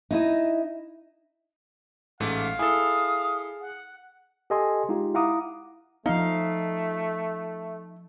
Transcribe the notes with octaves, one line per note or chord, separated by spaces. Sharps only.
D#4 E4 D#5
A1 G#2 A3 F5 D6
E4 G#4 A4 D#6
F#5
G4 A4 D#5 G#5 C6
G#3 D#4 F4 G4
E4 F5 F#5 A#5 D6 D#6
F3 A3 D#4 F5